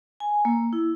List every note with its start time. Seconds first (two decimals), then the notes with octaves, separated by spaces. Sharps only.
0.20 G#5
0.45 A#3
0.73 E4